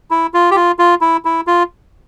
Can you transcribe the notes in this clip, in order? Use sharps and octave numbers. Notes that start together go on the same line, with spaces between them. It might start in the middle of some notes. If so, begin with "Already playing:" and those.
E4
F4
G4
F4
F4
E4
E4
F4